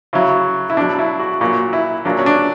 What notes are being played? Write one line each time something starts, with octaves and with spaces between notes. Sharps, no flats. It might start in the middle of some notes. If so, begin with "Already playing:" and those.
C#3 F#3 E4
E4
B2 F#3 D4
E4
F#4
A#2 F#3 F#4
E4
A#2 F#3 D4
C#4
D4